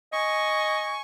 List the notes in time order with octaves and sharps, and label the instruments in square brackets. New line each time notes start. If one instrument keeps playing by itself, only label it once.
[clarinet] D#5 [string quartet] G#5 C#6